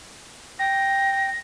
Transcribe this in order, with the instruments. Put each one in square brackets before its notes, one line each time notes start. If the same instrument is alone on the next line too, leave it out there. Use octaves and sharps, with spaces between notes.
[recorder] G5 [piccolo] A#6